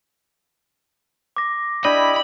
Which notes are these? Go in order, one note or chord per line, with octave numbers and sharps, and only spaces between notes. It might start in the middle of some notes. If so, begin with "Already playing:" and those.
D6 A#6
D4 E4 G4 D#5 B5